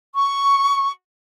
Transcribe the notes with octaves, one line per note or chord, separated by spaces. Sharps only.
C#6